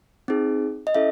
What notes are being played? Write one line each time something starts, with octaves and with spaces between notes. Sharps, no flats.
C4 D#4 G#4
D#5
C#4 E4 A4 E5